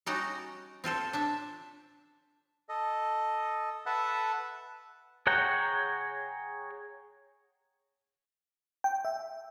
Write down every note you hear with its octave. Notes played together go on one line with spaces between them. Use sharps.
G3 C#4 D#4 F#4 D5 A#5
C4 F4 A4 C5
D4 E5 A5
A4 D#5
A4 B4 E5 F#5 A5
G#4 C#5 F#5 G5 A#5
G5
E5